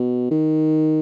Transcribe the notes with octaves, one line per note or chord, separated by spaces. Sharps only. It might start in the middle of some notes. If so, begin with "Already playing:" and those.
Already playing: B2
D#3